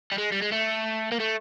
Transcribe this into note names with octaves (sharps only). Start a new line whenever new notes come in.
G3
G#3
G3
G#3
A3
A#3
A3